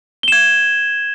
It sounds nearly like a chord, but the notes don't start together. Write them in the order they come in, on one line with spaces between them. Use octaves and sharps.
G7 E7 G#6